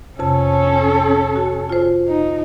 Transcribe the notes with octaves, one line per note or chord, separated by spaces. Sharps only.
F2 C3 C#4 A4 A5
F#4
F4 C5
D#4